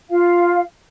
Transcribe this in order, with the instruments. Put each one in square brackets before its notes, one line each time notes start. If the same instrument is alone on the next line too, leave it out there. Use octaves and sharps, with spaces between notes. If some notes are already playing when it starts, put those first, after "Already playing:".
[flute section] F4 F5